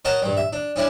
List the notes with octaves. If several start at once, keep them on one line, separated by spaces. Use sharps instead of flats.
A#4 C#5 D#5 F#5 A5 A#5
G2 G3
E5
D4
C#4 D4 E4 D5 G#5